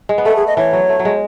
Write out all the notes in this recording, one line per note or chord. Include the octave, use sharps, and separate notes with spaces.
G#3
B3
A3 A4
G#4
D#5
E3 C#5
F#3
A3
F#3
G#3